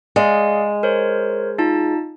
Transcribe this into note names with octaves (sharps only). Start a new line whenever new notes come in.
G#3 G#4 D5 F5
A#4 C5 C#5
D#4 F4 A5